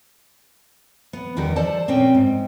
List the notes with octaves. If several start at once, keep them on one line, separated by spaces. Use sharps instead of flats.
B3
E2 D3 D#3 G3 G4 A#4
A4 C5 D5 A5
A#2 C4 C#4 G5
G#2